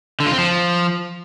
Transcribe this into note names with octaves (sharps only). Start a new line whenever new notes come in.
D3
F4
C4
F3